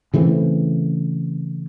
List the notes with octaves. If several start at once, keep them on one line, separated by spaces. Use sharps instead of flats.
C#3 E3 A3 C4